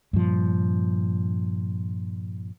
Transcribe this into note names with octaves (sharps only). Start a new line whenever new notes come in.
G2 A#2 F3